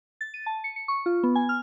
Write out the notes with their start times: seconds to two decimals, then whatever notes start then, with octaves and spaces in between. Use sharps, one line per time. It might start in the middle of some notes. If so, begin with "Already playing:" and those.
0.21 A6
0.34 D#7
0.46 A5
0.64 C#7
0.76 C#7
0.88 C#6
1.06 F4
1.23 B3
1.35 G#5
1.49 F6